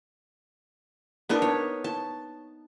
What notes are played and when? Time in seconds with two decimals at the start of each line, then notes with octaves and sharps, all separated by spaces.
1.29 B3 D4 D#4 A#4
1.42 C#5
1.84 A5